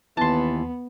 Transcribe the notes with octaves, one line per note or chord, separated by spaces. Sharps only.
D#2 E3 B3 A5 C6